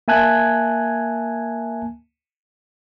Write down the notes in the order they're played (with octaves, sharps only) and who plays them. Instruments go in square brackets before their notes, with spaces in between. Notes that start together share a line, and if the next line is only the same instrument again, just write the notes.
[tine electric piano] A#3 E5 G#5 A5 F#6 G#6